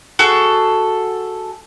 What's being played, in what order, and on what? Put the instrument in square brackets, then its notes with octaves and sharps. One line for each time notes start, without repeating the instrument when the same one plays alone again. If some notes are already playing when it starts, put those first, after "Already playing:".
[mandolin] F#4 G#4 A4